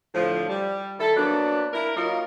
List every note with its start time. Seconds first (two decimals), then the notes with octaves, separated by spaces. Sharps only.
0.15 A2 D3 F3
0.49 G3
0.99 D#3 E4 A4
1.16 F#3 A#3 B3 D4
1.73 E4 A#4
1.96 F#3 A#3 D#4 F4 A#4